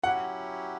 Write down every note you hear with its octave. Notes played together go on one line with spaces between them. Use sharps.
F#3 C#4 E4 G4 F#5